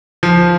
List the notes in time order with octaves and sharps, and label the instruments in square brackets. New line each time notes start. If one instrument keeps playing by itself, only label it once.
[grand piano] F3